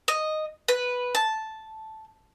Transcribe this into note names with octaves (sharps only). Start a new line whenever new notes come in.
D#5
B4
A5